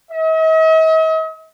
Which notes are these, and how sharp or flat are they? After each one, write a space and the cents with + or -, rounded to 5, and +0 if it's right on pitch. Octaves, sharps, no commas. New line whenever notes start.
D#5 +45